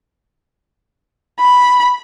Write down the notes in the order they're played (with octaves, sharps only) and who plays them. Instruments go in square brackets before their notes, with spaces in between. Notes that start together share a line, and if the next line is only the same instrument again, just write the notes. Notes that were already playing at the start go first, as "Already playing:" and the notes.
[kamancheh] B5